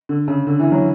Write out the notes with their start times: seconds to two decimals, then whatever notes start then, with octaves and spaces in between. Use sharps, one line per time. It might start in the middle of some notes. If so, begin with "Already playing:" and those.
0.09 D3
0.28 C#3
0.47 D3
0.60 E3
0.72 F#3